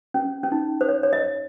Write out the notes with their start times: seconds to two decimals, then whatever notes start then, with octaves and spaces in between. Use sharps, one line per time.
0.14 C#4
0.44 C#4
0.52 D#4
0.81 C5
0.89 C#5
1.03 C#5
1.13 D#5